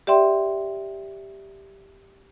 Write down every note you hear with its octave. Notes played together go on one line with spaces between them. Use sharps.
G4 D5 E5 G5 C6